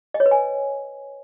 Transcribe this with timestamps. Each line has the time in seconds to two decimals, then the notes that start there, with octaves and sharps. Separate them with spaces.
0.14 D#5
0.20 C#5
0.26 B4
0.31 G#5